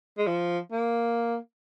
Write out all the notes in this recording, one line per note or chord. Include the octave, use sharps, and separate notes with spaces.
G#3
F3
A#3